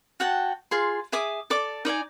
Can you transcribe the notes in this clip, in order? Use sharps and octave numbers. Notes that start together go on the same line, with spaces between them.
F#4 F#5 G5 A5
F4 G#4 C6
G#4 E5 D6 D#6
A4 D5 D6
D#4 D5 E5 G#5